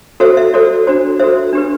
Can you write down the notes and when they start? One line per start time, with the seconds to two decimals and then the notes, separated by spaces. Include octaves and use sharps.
0.20 F#4 A4 C5 E5
0.37 E5
0.54 F#4 A4 C5 D5
0.87 D4 F#4 C5
1.19 F#4 A4 C5 E5
1.53 D4 G4 B4